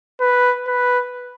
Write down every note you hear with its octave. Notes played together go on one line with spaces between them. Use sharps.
B4
B4